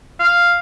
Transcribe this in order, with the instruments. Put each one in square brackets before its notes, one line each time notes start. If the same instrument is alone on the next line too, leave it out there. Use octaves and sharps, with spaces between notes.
[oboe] F5